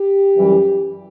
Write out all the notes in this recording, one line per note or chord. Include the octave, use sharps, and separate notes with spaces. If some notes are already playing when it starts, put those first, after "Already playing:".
Already playing: G4
F#2 E3 G3